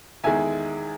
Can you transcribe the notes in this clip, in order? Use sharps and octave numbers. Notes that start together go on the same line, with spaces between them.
E2 D#3 G#3 E5 G#5